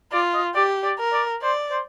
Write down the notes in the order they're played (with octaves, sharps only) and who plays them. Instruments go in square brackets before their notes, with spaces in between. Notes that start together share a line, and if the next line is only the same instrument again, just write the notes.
[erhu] F4 [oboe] D5
[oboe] D#5
[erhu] G4 [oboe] D5
[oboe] D5
[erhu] A#4
[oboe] D5
[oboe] C5 [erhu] D5
[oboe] C5